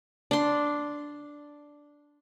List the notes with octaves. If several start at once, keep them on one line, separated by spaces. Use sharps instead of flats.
D4 C6